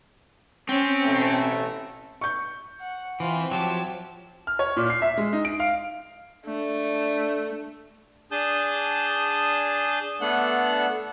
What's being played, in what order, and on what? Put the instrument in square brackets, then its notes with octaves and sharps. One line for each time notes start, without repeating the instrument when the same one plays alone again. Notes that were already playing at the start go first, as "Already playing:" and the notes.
[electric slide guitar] C4 [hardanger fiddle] C#4
[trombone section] A1 B2 A3
[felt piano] C#6 G6
[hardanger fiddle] F#5
[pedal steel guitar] E3 [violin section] C4 E5 G5 [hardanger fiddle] F4
[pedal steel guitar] F3 F#3 [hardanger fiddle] G4 A5
[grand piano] F6
C#5
A#2
C7
E5
G#3
D#4
D7
F5
[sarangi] A3 [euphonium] D4
[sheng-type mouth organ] D4 G#4 A5 D#6 G6
A3 B3 D4 A4 F#5 F#6